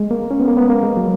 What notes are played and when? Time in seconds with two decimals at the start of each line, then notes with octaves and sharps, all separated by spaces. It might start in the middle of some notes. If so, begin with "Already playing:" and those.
Already playing: G#3
0.11 A#3
0.31 C#4
0.40 B3
0.48 A#3
0.57 B3
0.70 A#3
0.83 G#3
0.97 F#3